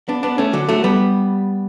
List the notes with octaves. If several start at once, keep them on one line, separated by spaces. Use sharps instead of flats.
B3 D4
B3 D4
A3 C#4
D3 F#3
F#3 A3
G3 B3